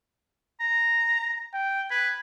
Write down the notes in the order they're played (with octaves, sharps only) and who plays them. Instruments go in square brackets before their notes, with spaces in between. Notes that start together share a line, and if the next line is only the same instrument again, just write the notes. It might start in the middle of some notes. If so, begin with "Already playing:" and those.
[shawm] A#5
[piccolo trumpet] G5
[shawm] B4 [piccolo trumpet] G#6